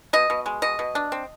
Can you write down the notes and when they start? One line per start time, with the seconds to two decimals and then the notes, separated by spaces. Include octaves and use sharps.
0.13 B2 D#5
0.30 B2
0.46 G#3
0.62 B2 D#5
0.79 B2
0.95 D4
1.12 C4